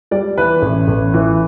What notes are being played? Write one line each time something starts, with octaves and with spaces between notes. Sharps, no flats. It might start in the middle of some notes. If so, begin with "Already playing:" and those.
G3 D5
E3 B4
A1
A1
E3